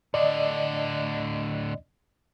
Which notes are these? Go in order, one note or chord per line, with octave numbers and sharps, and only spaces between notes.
A2 D3 D5 D#5